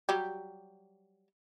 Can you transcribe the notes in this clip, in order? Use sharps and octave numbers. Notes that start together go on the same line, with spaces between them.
F#3 G3 G4